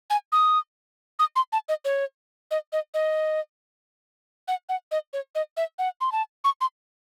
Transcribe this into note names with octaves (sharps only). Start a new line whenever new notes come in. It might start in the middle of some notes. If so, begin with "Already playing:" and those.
G#5
D#6
D#6
C6
A5
D#5
C#5
D#5
D#5
D#5
F#5
F#5
D#5
C#5
D#5
E5
F#5
C6
A5
C#6
C6